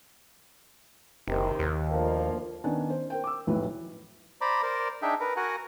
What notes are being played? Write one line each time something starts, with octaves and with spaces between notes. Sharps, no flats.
F#1 C3 D#3
D#2
D2 F3 A#3
D#3 B3 C#4 D4
C5
A#4 C5 G5
D6 E6
F1 B1 A2 B4
C5 D5 A#5 B5 D6
A#4 C5 D5
D4 D#4 G#4 E5 G5
A#4 B4
F#4 A#4 F#5 G#5